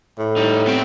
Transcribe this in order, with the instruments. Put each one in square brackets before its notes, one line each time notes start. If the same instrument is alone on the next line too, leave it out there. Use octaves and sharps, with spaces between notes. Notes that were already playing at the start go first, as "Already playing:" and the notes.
[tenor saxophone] A2
[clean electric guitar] G3 D#4
B3 C4 G5